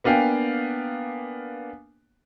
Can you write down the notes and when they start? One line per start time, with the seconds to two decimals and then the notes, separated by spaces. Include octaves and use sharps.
0.04 A#3 B3 D4 F5 G5 G#5